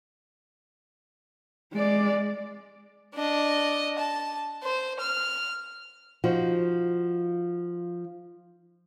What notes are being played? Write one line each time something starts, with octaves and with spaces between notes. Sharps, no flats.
G#3 D5
D4 D#5
A5
C5
F6
F3 D#4 F#4